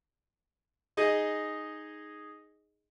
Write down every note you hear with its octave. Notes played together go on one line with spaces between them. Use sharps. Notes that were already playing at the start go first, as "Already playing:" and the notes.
D#4 G#4 D#5